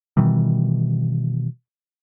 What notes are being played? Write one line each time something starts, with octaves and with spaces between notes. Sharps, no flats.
B2 D#3 E3 G3